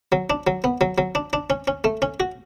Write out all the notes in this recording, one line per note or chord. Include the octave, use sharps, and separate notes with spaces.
F#3
D4
F#3
B3
F#3
F#3
D4
D4
C#4
C#4
A3
C#4
F#4